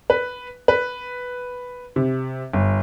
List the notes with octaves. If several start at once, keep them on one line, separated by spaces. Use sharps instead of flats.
B4
B4
C3
G1